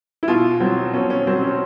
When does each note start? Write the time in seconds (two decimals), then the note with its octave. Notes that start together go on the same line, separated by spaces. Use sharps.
0.23 E4
0.28 B2 F4
0.60 F#3 C4
0.94 B2 C#4
1.10 C#4
1.27 F#3 C4
1.43 C#4